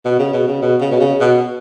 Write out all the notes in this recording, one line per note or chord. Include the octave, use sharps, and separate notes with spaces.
B2
C#3
B2
C#3
B2
C#3
B2
C#3
B2